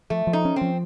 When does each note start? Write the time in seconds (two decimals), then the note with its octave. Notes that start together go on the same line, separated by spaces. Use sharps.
0.10 F3 A3
0.27 F3
0.33 D#4
0.45 C#4
0.56 C4
0.61 F3